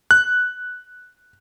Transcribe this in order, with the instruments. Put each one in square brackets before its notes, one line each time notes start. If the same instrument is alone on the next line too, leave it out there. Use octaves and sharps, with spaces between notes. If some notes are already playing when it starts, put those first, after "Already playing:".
[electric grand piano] F#6